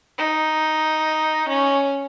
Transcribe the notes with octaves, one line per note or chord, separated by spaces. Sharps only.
D#4
C#4